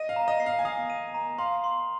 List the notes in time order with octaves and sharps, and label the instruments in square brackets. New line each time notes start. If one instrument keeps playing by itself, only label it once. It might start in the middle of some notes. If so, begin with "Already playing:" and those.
Already playing: [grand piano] D#5 [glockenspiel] D#7
[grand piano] F5
[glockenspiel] A#5
[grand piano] D#5
[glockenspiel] C7
[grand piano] F5
G#5
[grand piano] F5 [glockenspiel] D#6
[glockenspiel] D#7
A#5
[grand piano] F5 [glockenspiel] C6
[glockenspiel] C6